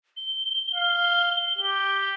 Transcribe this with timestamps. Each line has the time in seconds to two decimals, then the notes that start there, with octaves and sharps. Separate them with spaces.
0.17 G7
0.75 F5
1.59 G4